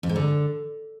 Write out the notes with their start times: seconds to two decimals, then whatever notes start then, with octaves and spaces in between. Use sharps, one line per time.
0.03 F2
0.09 G#2
0.16 D3